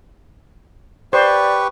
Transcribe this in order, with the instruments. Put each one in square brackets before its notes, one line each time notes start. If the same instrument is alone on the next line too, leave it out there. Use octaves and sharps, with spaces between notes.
[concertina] G4 B4 C#6 [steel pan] C5 [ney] D5